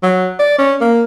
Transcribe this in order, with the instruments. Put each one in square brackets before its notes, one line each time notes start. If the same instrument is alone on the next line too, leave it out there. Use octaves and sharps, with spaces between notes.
[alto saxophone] F#3
D5
C#4
A#3